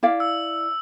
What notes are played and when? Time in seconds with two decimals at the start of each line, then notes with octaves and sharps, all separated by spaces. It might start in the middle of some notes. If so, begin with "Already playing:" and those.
0.03 E4 D5 F5
0.20 E6